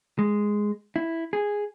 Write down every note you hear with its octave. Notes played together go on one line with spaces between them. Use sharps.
G#3
E4
G#4